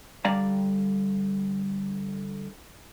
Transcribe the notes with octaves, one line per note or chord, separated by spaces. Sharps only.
D3 G3 D5 F5 A#5